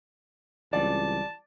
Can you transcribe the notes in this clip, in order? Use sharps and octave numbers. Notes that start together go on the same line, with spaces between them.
C#2 E3 G3 C4 D5 A5